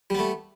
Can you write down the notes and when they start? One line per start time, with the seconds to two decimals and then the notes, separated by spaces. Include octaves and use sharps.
0.10 G3
0.15 B3
0.19 A3